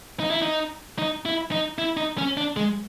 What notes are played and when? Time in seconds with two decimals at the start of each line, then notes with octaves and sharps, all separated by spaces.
0.20 D#4
0.30 E4
0.42 D#4
0.98 D#4
1.25 E4
1.52 D#4
1.78 E4
1.97 D#4
2.18 C#4
2.37 D4
2.56 G#3